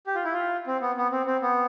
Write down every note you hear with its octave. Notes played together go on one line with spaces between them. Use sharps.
G4
F4
E4
F4
C4
B3
B3
C4
C4
B3